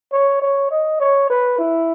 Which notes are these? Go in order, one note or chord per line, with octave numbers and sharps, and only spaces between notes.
C#5
C#5
D#5
C#5
B4
E4